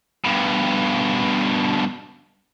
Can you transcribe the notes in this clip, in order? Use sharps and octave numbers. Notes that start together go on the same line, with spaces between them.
G2 B2